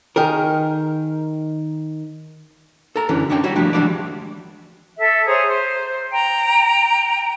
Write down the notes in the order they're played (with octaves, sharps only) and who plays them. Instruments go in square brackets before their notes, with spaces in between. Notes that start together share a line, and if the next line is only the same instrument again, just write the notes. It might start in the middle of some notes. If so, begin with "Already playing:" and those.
[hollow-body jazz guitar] D#3 G#4 A#4
A4 A#5
F#2 D3 E3 C#4
C#3 D4 C#5 D5 G5
G3 F#4 C#5
F3 G3 A3 D4 E4
E3 G3 G#3 D4 F#4 D5
[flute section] A4 E5
G#4 C5 C#5 A#5
C5
G5 A#5